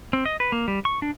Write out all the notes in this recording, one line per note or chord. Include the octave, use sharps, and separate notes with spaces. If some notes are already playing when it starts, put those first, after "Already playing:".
C4
D#5
B4
A#3
G3
C#6
D4